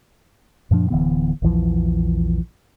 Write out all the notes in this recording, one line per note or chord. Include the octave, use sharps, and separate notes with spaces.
F#2 A#2 F3 D4
D1 D3 E3 B3
A#1 E2 E3 F3